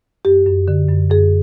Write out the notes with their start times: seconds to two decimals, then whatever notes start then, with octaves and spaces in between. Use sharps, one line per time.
0.25 F#2 G4
0.46 F#2
0.68 D3
0.89 F#2
1.10 F#2 G#4